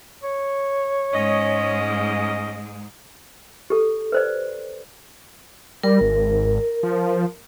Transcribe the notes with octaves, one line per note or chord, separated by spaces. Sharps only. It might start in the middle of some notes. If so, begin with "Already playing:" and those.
C#5
G#2 G#3 C#4 D#5
G4 A4
B4 C5 D5
G3 A#4
G#1
F3